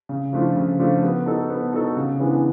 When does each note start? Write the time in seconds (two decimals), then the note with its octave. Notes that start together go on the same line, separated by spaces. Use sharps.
0.09 C#3
0.33 F3 A3 D4 F4
0.56 C#3
0.79 F3 A3 D4 F4
1.02 B3
1.26 D#4 F#4 A4
1.50 B3
1.73 D#4 F#4 A4
1.97 C#3
2.19 E3 G#3 B3 D4